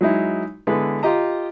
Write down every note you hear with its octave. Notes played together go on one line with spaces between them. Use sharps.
F#3 G#3 D#4 E4
D3 G#3 B3 E4 G#4 B4
F4 G4 D#5 A#5